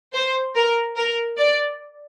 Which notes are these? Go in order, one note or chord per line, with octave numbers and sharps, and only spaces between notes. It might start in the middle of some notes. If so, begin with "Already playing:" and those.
C5
A#4
A#4
D5